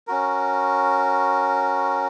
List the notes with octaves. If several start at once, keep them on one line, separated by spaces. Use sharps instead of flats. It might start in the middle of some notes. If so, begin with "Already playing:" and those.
C#4 F#4 A#4